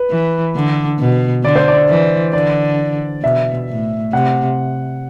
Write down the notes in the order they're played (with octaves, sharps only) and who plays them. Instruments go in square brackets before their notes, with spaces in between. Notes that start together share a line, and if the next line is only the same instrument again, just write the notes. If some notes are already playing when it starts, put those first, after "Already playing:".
Already playing: [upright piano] B4
[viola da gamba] E3
D3
B2
[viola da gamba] D3 [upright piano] D5
[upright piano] C5
D5
[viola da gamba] E3
[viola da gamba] D3 [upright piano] D5
[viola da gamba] B2 [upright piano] E5
[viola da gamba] A2
[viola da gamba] C3 [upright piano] F#5